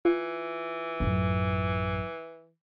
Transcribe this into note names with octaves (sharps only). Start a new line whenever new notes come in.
E3 F4
A1 F#2